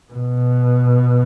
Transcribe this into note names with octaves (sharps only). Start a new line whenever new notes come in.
B2